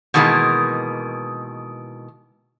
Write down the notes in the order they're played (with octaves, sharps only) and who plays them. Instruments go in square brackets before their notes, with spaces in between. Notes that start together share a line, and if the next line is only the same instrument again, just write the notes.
[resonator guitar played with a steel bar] B2 D#3 E3 G#3 A#3